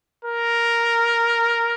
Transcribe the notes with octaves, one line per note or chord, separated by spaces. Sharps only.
A#4